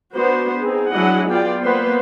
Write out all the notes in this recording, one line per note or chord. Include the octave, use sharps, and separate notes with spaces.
B3 D4 F#4 C5
C4 D#4 G#4
F#3 D4 E4 G#4 D#5 F#5
B3 F4 D5 G5
A#3 B3 B4 C5 C6